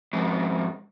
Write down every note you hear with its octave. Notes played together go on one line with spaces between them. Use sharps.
F2 G#2